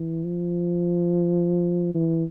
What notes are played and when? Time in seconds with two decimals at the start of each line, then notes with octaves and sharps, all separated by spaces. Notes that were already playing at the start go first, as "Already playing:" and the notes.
Already playing: E3
0.24 F3
1.95 E3